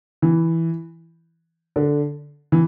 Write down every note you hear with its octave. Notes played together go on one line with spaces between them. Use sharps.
E3
D3
E3